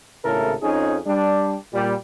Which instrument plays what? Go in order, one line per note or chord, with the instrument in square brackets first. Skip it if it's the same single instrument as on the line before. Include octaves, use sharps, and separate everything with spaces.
[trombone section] G#1 A2 C#3 E4 A4 A#4
F2 C#4 D#4 G#4
G3 D4
A#2 G3